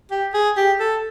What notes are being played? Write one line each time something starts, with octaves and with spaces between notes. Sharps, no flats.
G4
G#4
G4
A4